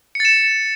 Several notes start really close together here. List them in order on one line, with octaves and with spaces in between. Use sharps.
C#7 A6 E7